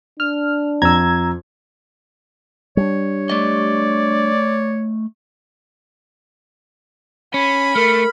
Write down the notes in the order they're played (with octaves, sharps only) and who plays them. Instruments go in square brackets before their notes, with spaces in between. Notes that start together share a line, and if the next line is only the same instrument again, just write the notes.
[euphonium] D4 [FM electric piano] F6
[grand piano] F2 [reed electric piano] A#5 E6 [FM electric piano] G#6
[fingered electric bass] G3 C#4 D4 [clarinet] C#5
[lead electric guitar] A3 D#5 [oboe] D5
[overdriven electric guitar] C#4 [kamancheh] B5
[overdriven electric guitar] A3 [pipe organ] A#4